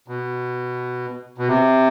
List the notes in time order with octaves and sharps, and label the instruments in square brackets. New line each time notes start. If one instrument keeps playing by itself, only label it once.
[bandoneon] B2
B2
C3